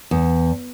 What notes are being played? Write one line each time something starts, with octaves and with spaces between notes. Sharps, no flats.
E2